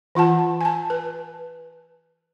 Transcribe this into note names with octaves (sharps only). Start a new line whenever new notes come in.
E3 F4 F#5 A5
G#5 A5
B4